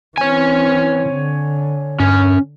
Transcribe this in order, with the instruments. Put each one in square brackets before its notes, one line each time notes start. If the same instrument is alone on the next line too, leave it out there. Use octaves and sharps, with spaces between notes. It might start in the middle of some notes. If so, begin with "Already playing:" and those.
[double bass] E3 C4 [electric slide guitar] C#5 G#5
[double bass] D3
[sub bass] G2 [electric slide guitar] C#4